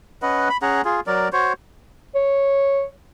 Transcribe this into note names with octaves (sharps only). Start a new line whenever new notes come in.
C#4 B4 D#5 F#5
B5
C#4 G#4 F#5 A#5
F4 G#4
F#3 A#4 D5
F#4 C5 C#5
C#5